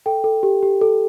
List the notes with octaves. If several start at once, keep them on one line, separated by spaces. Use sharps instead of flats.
A4 G5
A4
G4
G4
A4